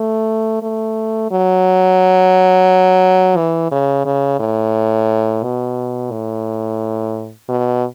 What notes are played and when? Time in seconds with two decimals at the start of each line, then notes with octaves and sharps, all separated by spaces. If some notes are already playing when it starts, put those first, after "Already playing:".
Already playing: A3
0.62 A3
1.31 F#3
3.37 E3
3.71 C#3
4.05 C#3
4.39 A2
5.43 B2
6.11 A2
7.49 B2